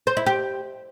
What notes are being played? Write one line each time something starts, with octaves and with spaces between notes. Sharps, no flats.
C5
E4
G4